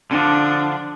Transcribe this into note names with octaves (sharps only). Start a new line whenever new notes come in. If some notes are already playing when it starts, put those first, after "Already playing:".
D3 F3 D4